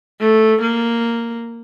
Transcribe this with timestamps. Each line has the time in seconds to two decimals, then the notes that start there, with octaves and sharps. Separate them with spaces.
0.20 A3
0.61 A#3